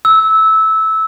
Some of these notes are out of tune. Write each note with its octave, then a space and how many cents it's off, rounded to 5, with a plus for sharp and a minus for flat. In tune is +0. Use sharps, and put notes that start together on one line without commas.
E6 -15